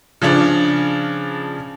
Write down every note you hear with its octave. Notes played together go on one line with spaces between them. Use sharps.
C#3 F3 C#4 D4